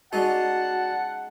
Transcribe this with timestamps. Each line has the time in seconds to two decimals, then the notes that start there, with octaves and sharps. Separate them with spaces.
0.13 G#3 C#4 D#4 F#4 D5 F#5 A5